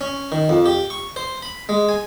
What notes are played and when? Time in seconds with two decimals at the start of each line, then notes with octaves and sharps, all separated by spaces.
0.01 C#4
0.32 D#3
0.49 F2
0.66 G4
0.90 C#6
1.16 C5
1.42 B5
1.69 G#3
1.89 G#5